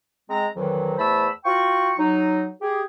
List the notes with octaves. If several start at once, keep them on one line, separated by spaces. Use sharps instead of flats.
G#3 C4 A#5
F2 D#3 E3 F#3
E2 A3 C5 A5 B5 E6
F4 F#4 G5 C#6
F#3 D#4
G4 G#4